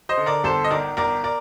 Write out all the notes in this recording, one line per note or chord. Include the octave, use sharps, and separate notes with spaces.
C5 D#5
D3
A#4 D5
G1 A4 C5
D#5
D#3 A#4 D5
G1 A#4 D5
A#4 D5